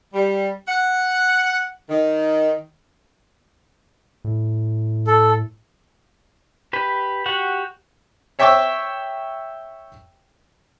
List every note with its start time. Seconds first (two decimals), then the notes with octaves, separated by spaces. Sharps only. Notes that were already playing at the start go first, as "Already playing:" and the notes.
0.14 G3
0.68 F#5
1.89 D#3
4.24 A2
5.07 A4
6.73 G4 B4
7.26 F#4 G4 F#5
8.39 C#5 E5 G5 C#6 D6 E6